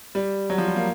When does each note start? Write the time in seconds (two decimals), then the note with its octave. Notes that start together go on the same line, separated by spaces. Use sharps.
0.15 G3
0.50 F#3
0.58 F3
0.68 G3
0.76 A#3